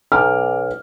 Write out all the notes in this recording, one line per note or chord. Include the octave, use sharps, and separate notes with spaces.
B1 D6 F6